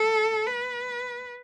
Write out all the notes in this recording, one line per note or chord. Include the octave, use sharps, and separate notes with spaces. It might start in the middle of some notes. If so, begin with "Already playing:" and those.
Already playing: A4
B4